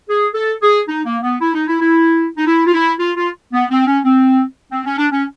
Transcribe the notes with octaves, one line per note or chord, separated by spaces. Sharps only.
G#4
A4
G#4
D#4
A#3
B3
E4
D#4
E4
E4
D#4
E4
F4
E4
F4
F4
B3
C4
C#4
C4
C4
C#4
D4
C#4